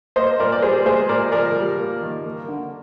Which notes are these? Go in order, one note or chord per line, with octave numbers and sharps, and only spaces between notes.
A#3 C5 D#5
A#2 A#4 D5
D5
G3 G#4 C5
G#3 G#4 C5
A#2 A#4 D5
F3 A#4 D5
G3
A#3
D#3
A#3
D3